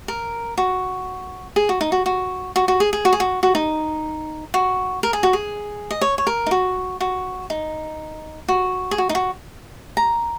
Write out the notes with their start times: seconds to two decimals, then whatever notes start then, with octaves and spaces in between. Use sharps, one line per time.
0.08 A#4
0.58 F#4
1.56 G#4
1.69 F#4
1.81 D#4
1.92 F#4
2.06 F#4
2.56 F#4
2.68 F#4
2.80 G#4
2.93 G#4
3.05 F#4
3.13 G#4
3.20 F#4
3.43 F#4
3.55 D#4
4.54 F#4
5.03 A#4
5.13 G#4
5.23 F#4
5.33 G#4
5.91 D#5
6.01 C#5
6.18 C#5
6.27 A#4
6.46 D#4
6.51 F#4
7.01 F#4
7.50 D#4
8.48 F#4
8.91 G#4
8.98 F#4
9.09 D#4
9.15 F#4
9.97 A#5